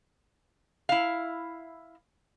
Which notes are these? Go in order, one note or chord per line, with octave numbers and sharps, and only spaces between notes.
E4 F5